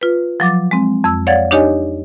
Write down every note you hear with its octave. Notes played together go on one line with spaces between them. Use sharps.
F4 B4
F3 F#3 D6 A6
G#3 C4
F2 E6
C#5 D5 F5 F#5 G#6 A6
D4 D#4 G4 C#5 D#5 G#5